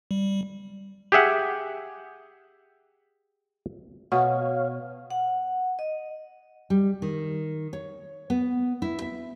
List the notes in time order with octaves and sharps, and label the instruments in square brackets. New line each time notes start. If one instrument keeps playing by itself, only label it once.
[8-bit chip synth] G3
[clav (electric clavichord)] G4 G#4 E5 F#5
[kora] B2 [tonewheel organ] C#5 F5 [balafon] F#5
[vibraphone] F#5
D#5
[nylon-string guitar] G3
D#3
C#5
B3
E4
E5